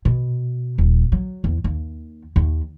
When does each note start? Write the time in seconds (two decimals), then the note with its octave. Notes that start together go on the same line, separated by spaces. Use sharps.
0.05 B2
0.78 D#1
1.12 F#3
1.44 E2
1.64 D#2
2.36 D#2